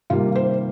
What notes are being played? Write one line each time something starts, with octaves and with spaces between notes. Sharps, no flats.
C3 D#3 G3 A#3 F4
C5